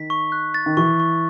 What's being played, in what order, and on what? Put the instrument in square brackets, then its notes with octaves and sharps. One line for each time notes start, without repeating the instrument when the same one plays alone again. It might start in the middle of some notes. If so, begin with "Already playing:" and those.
Already playing: [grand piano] D#3 [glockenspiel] B6
[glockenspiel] C#6
F#6
A6
[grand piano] D#3
[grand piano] E3 [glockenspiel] C#6
[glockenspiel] C#6